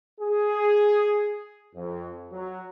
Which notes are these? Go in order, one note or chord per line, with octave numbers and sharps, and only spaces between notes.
G#4
F2
F#3